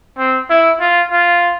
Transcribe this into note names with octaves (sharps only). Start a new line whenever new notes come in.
C4
E4
F4
F4